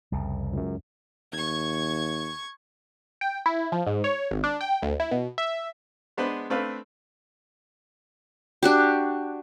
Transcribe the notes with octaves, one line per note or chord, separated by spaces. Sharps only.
C2 F2 C#3
C#2 F#2
D#2 C#6 G#6
G5
E4
F3
G#2
C#5
G#1
D4
G5
D2
E4
B2
E5
G#3 B3 D4 B4 C5
A3 C4 D4 B4 F5
D4 F#4 G4